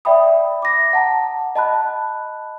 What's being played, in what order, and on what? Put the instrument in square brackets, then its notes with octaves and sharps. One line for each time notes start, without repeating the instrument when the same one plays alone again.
[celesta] D5 E5 G5 B5 D#6
D6 A#6
F#5 A5 A#5
D#5 A5 B5 F#6